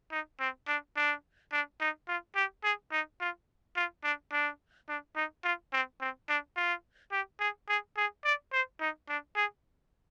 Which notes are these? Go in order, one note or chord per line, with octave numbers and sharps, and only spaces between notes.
D#4
C4
D4
D4
D4
D#4
F4
G4
G#4
D#4
F4
F4
D4
D4
D4
D#4
F4
C4
C4
D4
F4
G4
G#4
G#4
G#4
D5
C5
D#4
D4
G#4